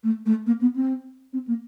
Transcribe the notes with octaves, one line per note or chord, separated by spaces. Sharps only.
A3
A3
A#3
B3
C4
C4
A#3